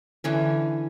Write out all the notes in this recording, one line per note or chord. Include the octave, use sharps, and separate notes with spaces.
D3 E3 C#4